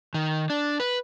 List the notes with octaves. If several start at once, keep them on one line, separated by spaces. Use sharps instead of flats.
D#3
D4
B4